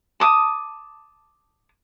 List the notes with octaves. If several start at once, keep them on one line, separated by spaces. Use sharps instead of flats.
A5 D6 D#6